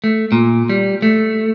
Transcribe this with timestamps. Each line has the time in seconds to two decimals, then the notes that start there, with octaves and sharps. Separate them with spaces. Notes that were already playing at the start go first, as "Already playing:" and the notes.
0.04 A3
0.32 A#2
0.69 G3
1.02 A3